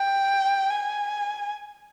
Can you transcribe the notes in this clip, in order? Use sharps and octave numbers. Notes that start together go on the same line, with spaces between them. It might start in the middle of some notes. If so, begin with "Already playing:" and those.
Already playing: G5
G#5